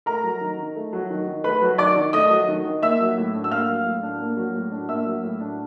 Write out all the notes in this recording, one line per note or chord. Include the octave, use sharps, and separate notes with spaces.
A3 A#4 A#5
F#3
D#3
D#3
A3
F#3
D#3
D#3
A3 B4 B5
F#3
D#3 D5 D6
D#3
A3 D#5 D#6
F#3
D#3
D#3
A#3 E5 E6
F#3
A2
D4
E6
A#3 F5 F6
F#3
A2
D4
A#3
F#3
A2
D4
A#3 E5 E6
F#3
A2
D4